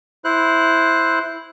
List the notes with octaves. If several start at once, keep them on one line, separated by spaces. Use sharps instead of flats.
E4 C5 F#6